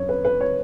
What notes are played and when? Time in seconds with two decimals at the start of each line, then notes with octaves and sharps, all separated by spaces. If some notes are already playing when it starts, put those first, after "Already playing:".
Already playing: F#2 C#5
0.09 B4
0.25 B4
0.41 C#5